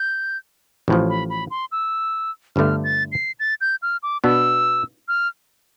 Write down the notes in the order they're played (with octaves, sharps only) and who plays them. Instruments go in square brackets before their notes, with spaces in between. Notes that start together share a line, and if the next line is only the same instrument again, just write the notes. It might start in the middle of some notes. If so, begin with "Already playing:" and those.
Already playing: [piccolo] G6
[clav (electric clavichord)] A1 A2 F3
[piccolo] B5
B5
C6
E6
[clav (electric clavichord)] G1 G2 D3 A3 [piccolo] F6
[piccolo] A6
C7
A6
G6
F6
D6
[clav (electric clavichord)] B2 B3 D4 [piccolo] E6
[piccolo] F6